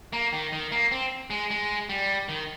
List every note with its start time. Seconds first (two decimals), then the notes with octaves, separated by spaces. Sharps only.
0.13 A#3
0.33 D#3
0.53 D#3
0.72 A#3
0.92 C4
1.30 G#3
1.50 G#3
1.89 G3
2.29 D#3